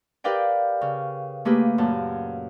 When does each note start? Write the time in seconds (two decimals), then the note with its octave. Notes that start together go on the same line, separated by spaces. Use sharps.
0.24 G4 A#4 B4 D5 F5 G5
0.81 C#3
1.45 A3 A#3 G4 G#4 B4
1.78 F#2 A#2 A5